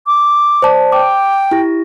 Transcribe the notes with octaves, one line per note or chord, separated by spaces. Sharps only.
D6
C5 D5 A5
G5 D6
E4 G4 A#6